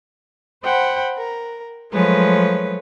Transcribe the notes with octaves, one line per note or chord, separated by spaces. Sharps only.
C5 F#5 G5 B5
A#4
F3 F#3 G#3 A3 B4 C#5